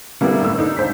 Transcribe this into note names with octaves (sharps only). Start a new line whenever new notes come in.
D3 G3 A#3 B3 D4 E4
A2 E6
D4 D#4
C#2 C5 B6